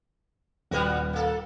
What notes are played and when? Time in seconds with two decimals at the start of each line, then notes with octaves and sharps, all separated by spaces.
0.71 D#1 G3 B3 F#4 B4 G5
1.13 A#3 A4